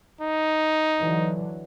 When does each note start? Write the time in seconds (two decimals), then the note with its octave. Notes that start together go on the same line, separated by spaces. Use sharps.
0.21 D#4
1.00 D3 E3 F#3